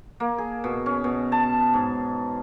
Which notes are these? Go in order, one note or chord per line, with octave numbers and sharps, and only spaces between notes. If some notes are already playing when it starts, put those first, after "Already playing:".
A#3
G#4
B2
C#4
B2
A5
G#2